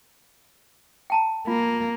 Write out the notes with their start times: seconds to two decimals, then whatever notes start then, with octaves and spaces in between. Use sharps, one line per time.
1.10 G5 A5 A#5
1.47 A#3 F4